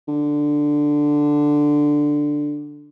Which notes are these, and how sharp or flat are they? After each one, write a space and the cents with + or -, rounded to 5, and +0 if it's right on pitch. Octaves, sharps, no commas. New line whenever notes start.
D3 +5